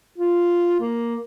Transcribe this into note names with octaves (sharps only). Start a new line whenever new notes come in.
F4
A#3